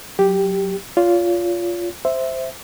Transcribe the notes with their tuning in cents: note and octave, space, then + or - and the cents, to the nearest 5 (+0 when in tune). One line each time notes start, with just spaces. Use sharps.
F#3 +0 G4 +0
F4 +0 C#5 +45
C5 +0 E5 +0